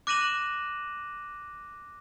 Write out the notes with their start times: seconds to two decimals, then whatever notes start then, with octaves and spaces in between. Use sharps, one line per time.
0.07 D6 F#6 A#6 D#7 E7 F#7